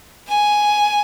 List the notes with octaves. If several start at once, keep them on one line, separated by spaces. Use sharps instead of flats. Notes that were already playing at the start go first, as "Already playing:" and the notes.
G#5